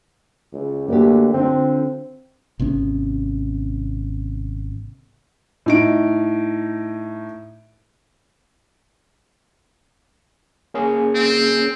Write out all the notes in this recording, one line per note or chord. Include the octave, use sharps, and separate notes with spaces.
C#2
D2 A#3 F#4 G4
D3 C4 F4
G#1 C3 B3 C#4
A2 D#4 D7
A#3 C#4 G#4
C4